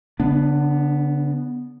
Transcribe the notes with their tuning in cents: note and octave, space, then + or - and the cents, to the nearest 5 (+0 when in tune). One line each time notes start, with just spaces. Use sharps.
D3 -45 B3 +0 D4 +20